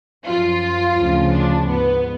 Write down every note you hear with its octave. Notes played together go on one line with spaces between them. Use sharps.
F#2 F3 F4
D2 C#3 F3
D4
G#2 F3 B3